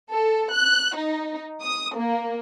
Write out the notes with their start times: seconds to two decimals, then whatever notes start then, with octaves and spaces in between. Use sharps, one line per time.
0.10 A4
0.52 F#6
0.96 D#4
1.62 D#6
1.96 A#3